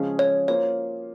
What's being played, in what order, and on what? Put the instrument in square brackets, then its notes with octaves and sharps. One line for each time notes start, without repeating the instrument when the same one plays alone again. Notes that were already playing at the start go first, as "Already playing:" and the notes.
Already playing: [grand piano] C#3 F3 G#3 C#4 G#4
[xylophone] C#5
[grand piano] A#3 F4 C5 [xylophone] C#5